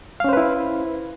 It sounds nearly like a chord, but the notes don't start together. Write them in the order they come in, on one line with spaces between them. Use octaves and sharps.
F5 C#4 C5 B4 E4